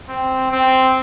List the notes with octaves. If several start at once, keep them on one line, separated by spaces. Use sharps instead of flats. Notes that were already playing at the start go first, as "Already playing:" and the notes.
C4
C4